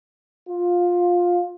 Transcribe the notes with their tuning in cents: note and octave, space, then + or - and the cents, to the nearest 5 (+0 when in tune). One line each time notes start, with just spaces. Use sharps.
F4 +15